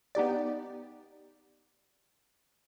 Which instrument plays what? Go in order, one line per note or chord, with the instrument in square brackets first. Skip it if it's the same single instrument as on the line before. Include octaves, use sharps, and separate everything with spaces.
[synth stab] B3 D#4 G4 D5